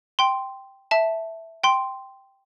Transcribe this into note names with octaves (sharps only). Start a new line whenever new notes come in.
G5 C6
E5 A5
G5 C6